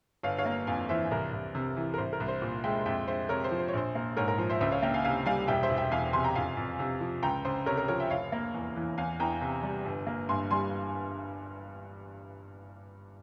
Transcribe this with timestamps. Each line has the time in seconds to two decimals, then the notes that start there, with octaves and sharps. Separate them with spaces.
0.23 G1 C#5 F5
0.38 C#5 F5
0.46 A#3
0.67 F2 F5 G#5
0.89 E3 C5 E5
1.11 C2 A#4
1.33 C2
1.55 C3
1.76 E3
1.94 A#4
1.98 C2 C5
2.13 A#4
2.20 C2
2.28 C5
2.42 A#2
2.64 G#3 E5 G5
2.86 F2 E5 G5
3.08 G#3 C5 E5
3.29 C3 A#4 C#5
3.44 C5
3.51 F3
3.59 C5
3.68 C#5
3.73 A#1 C5
3.95 A#3
4.17 G#2 A#4 C#5
4.28 A#4
4.38 F3 C5
4.50 C5 E5
4.60 C#2 C5 E5
4.72 C#5 F5
4.83 A#3 E5 G5
4.94 F5 G#5
5.04 C3 F5 G#5
5.26 G3 F5 G#5
5.48 E1 E5 G5
5.63 C5 E5
5.70 E1
5.77 E5 G5
5.91 E2 F5 G#5
6.13 C3 G#5 C6
6.24 G5 A#5
6.35 F2 F5 G#5
6.57 F2
6.79 C3
7.01 F3
7.23 C#2 G5 A#5
7.45 C#2 C5
7.66 C3 A#4 C#5
7.77 A#4 C#5
7.88 F3 A#4 C#5
8.00 E5 G5
8.10 F1 C#5 F5
8.32 A#3
8.54 E2
8.76 E3
8.98 E2 F5 G#5
9.20 E2 G5 A#5
9.41 C3
9.63 G3
9.86 G1
10.07 A#3
10.29 G2 G#5 C6
10.51 G3 G#5 C6